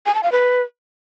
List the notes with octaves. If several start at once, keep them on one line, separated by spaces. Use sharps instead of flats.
G#5
A5
F5
B4